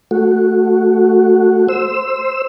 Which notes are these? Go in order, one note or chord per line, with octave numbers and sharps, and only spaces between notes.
A3 F#4
C5 E6